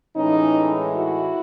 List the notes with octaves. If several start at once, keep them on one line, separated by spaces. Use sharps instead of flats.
A2 E3 G#3 C#4 D#4
E4 F#4